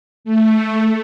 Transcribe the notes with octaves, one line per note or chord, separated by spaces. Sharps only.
A3